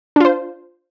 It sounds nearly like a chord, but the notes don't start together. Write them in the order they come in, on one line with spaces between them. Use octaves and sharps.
D4 F4 C5